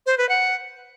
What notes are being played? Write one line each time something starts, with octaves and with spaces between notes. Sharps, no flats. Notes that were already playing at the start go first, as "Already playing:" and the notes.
C5
B4
F#5